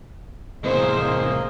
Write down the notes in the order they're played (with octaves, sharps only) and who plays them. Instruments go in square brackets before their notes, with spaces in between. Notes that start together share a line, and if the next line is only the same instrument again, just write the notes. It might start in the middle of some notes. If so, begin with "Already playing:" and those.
[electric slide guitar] E2 A2 C3 [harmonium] A#3 G#4 D#5 [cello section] C5